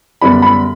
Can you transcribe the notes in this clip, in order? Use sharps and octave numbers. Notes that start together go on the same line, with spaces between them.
F#2 D3 G3 B3 D4 B5
B5